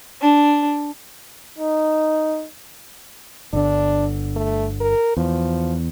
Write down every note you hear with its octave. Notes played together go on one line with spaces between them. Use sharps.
D4
D#4
G1 D3 D4
A3
A#4
E2 F3